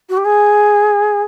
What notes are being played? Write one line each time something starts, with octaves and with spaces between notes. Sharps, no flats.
F#4
G4
G#4